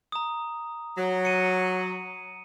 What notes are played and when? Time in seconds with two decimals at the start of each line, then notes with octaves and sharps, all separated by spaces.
0.12 A#5 D#6
0.96 F#3
1.25 C#7 D#7